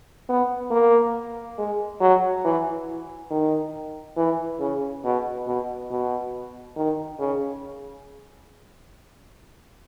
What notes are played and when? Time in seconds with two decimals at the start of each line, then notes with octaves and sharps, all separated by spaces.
0.29 B3
0.71 A#3
1.58 G#3
2.01 F#3
2.45 E3
3.31 D#3
4.17 E3
4.60 C#3
5.04 B2
5.47 B2
5.90 B2
6.77 D#3
7.20 C#3